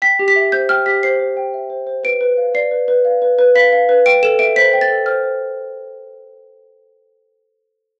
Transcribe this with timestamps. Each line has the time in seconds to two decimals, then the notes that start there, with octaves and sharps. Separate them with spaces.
0.02 G5 B6
0.19 G4
0.28 B6
0.36 E5
0.52 C5 G6
0.69 G5 F6
0.86 G4 B6
1.03 C5 C7
1.19 C5
1.37 G5
1.54 E5
1.70 C5
1.87 C5
2.04 B4 D7
2.21 B4
2.37 F5
2.54 D5 C7
2.71 B4
2.88 B4
3.05 F5
3.22 B4
3.39 B4
3.55 F5 B6
3.72 F5
3.89 B4
4.06 G5 D7
4.23 A4 E7
4.39 E5 D7
4.56 C5 B6
4.73 G5
4.81 A6
4.90 A4
5.06 C5 F6
5.23 C5